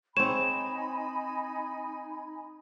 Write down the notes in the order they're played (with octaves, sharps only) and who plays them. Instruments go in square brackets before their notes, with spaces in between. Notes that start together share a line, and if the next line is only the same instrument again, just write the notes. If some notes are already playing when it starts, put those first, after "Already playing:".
[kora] C4 C#5 [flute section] D#4 G#5 B5 [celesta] E7